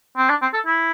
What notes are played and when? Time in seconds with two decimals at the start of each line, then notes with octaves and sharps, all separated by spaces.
0.17 C4
0.30 D4
0.42 C4
0.53 A4
0.66 E4